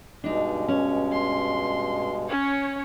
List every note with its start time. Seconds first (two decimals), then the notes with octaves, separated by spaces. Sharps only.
0.24 G2 B2 G#3 D4 D#4
0.68 C#4
1.12 C6
2.28 C#4 C#5